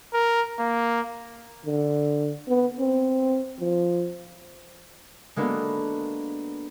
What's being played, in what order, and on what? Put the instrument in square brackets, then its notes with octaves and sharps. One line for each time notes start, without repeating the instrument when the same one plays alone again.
[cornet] A#4
A#3
[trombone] D3
B3
C4
F3
[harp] G#3 A#3 B3 D4 F#4 A4